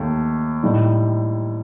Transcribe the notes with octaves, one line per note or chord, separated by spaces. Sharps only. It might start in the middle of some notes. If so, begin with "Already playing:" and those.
Already playing: D#2 A3
A2 G3 D#4